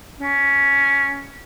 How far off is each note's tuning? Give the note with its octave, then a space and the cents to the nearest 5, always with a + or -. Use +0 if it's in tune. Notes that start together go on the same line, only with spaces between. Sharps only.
C#4 +10